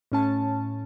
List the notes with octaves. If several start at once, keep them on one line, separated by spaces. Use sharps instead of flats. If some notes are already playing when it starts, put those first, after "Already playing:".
A2 C#4 A5